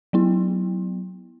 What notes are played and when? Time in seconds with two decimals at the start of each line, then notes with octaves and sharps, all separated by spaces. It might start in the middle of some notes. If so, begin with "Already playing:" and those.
0.13 F#3 B3 E4